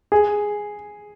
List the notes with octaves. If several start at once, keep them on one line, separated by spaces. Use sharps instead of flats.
G#4